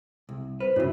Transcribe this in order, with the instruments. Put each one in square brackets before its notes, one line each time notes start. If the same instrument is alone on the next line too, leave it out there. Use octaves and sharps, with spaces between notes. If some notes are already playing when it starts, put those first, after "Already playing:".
[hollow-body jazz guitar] C2
[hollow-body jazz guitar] B4 [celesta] C5
[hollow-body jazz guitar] G2 C#3 [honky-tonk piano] F#3 E4 [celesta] C#5